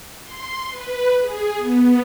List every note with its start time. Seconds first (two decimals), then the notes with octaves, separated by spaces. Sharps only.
0.24 C6
0.69 B4
1.21 G#4
1.59 B3